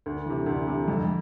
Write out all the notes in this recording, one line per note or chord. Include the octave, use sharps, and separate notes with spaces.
D2
C3 E3
D2
C3 E3
F2